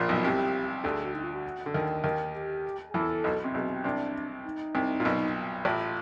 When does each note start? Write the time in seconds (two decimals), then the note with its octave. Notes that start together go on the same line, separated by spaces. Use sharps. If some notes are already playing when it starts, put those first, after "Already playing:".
Already playing: A#1 A#2
0.09 B1 B2
0.24 C2 C3 G4
0.84 D2 D3 G4
0.94 G#4
1.04 F#4
1.14 D#4
1.24 F4
1.34 F#4
1.66 D3
1.74 D#2 D#3
2.04 D#2 D#3
2.35 G4
2.89 G#4
2.94 E2 E3 A4
3.24 B1 B2
3.44 C3
3.54 B1 B2 G#4
3.65 G#4
3.75 G4
3.84 C2 C3 D4
4.45 D#4
4.75 C2 C3
5.00 A#2
5.05 B1 B2
5.65 A1 A2 F4